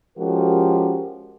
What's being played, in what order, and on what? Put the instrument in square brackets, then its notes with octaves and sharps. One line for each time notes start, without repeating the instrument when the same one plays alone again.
[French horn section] F3 G#3 C#4 F#4 G4 A#4